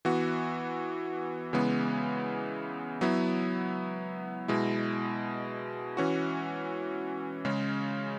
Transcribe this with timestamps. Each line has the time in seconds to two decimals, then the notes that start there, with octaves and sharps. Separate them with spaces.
0.05 E3 B3 F#4
1.53 C#3 E3 G#3 B3
3.01 F#3 B3 E4
4.48 B2 G#3 E4
5.97 E3 C#4 F#4
7.45 C#3 G#3 C#4